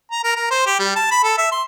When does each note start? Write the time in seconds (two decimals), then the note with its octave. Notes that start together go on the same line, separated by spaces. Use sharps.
0.12 A#5
0.23 A#4
0.35 A#4
0.51 C5
0.66 G4
0.79 G3
0.96 A5
1.11 B5
1.23 A4
1.38 E5
1.51 C6